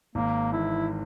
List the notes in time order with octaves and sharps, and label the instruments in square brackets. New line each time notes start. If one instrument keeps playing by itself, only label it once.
[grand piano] G#1 [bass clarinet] A#3
[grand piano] G#2 E3 [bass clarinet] E4